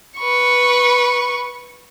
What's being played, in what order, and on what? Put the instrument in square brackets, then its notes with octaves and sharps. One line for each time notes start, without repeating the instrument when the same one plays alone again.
[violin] B4 C#6